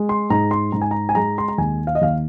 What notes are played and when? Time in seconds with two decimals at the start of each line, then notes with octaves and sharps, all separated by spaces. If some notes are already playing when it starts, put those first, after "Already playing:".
Already playing: G#3
0.09 C6
0.30 G#2 A#5
0.51 C6
0.72 G#2 A#5
0.82 G#5
0.91 A#5
1.09 G#5
1.15 G#3 A#5
1.38 C6
1.48 A#5
1.58 D#2 G#5
1.87 F5
1.95 D#5
2.01 D#2 F5